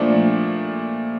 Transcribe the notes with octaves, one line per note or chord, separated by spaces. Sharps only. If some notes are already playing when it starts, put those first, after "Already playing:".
Already playing: A#2 F3 A3 D4